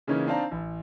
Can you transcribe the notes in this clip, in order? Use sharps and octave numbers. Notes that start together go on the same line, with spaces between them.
C#3 E3 A#3 C#4 D#4
C4 D4 D#4 F5 A5 A#5
A1